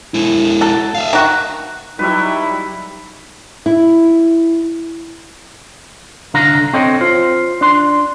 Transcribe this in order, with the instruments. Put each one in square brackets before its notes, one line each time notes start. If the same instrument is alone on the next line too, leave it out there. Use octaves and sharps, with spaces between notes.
[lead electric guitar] G#3 E4
[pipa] F#3 A4
[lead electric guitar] E5 F5
[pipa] D#3 F#4
[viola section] F#3 G3 E4 [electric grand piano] D#4 [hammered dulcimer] B4 E5
[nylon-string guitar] E4
[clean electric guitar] C2 D3 D4 F5 A#5
C4 A4 C#5 D#5 G5
F4 C5
D4 C6